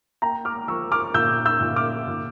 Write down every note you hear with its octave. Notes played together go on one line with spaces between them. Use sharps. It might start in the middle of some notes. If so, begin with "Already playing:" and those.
A#3 G5 A#5
D6 F6
F3 C#6 E6
D6 F6
A#2 E6 G6
E6 G6
A#2
D6 F6
A#2